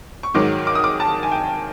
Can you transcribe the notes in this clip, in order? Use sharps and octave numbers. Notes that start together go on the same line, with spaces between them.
C#6
G#2 D#3 F#3 D6
D6
D#6
D6
A5
G#5
G5